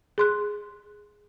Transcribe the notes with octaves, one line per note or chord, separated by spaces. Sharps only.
G#4 C6 F#6